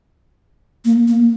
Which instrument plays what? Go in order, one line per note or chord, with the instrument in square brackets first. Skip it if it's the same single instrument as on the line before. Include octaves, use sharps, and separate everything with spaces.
[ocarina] A#3
A#3